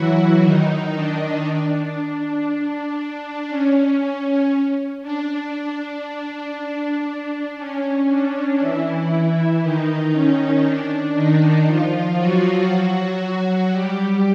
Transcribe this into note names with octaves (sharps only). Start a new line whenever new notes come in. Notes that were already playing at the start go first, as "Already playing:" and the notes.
Already playing: E3 F#3 E4 F#4
D#3 D#4
D4
D4
D4
D4
C#4
D4
D4
C#4
D4
E3 E4
D#3 D#4
C#4
D4
D#3 D#4
F3 F4
F#3 F#4
G3 G4